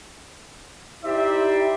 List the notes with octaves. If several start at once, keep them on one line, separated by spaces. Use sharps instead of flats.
D#4 E4 G4 C5 D5 E5